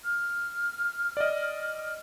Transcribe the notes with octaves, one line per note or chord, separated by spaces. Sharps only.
F6
D5 D#5